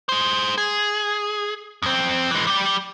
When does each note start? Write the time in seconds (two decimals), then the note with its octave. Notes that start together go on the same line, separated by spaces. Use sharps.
0.09 G#4 C5
0.58 G#4
1.82 F2 C4
2.31 E3 G#3
2.47 G3 G4